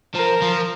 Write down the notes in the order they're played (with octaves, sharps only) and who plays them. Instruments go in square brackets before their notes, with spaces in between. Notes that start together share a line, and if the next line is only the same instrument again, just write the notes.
[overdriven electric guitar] F3 [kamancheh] A#4
[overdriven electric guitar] F3